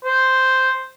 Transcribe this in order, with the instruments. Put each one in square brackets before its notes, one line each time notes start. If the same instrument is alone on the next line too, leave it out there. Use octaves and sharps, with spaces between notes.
[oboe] C5